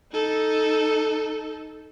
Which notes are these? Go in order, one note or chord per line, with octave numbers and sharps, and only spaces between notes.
D#4 A4